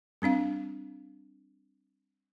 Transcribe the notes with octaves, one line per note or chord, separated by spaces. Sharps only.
G3 C4 D4 F5